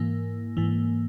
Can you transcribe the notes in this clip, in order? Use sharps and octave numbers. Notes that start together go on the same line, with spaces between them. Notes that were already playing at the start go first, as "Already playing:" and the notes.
Already playing: G#2 E3 A#3
G#2 E3